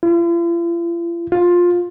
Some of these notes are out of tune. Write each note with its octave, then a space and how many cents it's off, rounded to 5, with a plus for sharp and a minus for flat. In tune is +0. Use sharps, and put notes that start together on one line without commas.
F4 -45
F4 +15